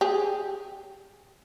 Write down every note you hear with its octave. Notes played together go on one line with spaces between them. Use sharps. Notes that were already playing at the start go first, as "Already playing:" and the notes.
G4 G#4